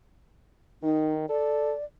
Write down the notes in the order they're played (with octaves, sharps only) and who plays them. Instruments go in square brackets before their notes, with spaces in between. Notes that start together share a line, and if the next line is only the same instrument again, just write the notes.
[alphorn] D#3 [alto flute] D#4
[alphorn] A4 [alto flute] D5